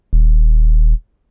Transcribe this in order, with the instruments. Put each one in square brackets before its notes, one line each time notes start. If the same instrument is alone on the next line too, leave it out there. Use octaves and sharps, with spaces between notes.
[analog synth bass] D#1